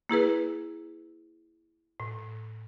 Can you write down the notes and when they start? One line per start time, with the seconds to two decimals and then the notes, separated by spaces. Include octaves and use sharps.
0.09 A#3 E4 G#4 B4
2.00 A2